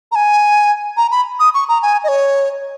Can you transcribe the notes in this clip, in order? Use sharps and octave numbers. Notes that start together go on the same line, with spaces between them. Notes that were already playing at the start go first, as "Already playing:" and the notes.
A#5
G#5
A#5
B5
D#6
C#6
A#5
G#5
D#5
C#5